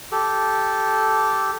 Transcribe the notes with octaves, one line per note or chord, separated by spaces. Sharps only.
G4 A4